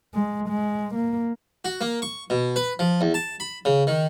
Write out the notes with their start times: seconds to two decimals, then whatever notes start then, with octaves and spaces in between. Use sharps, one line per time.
0.14 G#3
0.49 G#3
0.95 A#3
1.65 F#4
1.81 A#3
2.02 C#6
2.30 B2
2.56 B4
2.79 F3
3.01 E2
3.14 A5
3.40 B5
3.65 C#3
3.87 D#3